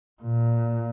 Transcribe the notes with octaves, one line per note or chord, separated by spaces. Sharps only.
A#2